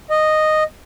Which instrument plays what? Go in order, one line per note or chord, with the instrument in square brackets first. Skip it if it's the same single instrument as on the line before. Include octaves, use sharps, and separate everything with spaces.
[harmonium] D#5